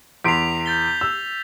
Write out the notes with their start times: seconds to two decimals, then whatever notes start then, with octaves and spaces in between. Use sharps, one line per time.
0.24 E2 C6 B6 C7 D7 F7
0.66 G6 A6 G7
1.01 E6